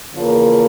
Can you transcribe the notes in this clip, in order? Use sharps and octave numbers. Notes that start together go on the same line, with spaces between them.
E2 C#3 F3 A#3